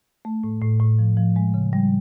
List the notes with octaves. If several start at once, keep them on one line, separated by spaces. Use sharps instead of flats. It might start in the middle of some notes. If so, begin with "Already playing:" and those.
A3
A2
A2
A2
F3
F3
G#3
C#3
G3